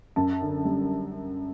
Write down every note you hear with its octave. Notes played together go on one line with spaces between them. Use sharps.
F#2 A5
D3
G3